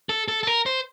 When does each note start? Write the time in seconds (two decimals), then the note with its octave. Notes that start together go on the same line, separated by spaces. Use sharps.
0.09 A4
0.28 A4
0.43 A4
0.47 A#4
0.66 C5